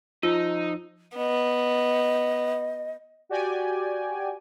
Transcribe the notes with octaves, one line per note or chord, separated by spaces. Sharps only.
F3 D#4 F4 E6
B3 D#5
F#4 G4 D5 G5 G#5